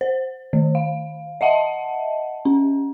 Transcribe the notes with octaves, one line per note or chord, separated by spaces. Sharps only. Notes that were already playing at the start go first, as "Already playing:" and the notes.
C5
D#3
F5
D#5 E5 F#5 A5
C#4